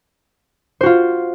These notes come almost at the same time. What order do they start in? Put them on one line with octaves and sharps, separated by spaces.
C5 F#4 F4